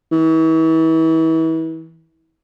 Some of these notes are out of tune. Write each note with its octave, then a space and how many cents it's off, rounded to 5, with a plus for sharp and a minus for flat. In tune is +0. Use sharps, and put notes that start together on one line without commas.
E3 -35